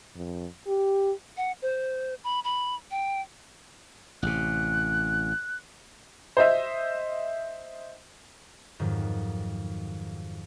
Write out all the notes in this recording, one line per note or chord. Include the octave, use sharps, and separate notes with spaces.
F2
G4
F#5
C5
B5
B5
G5
A1 C3 F#6
C5 D#5 E5
F2 G#2 D#3 F#3